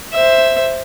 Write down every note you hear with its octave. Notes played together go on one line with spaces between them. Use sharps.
C5 E5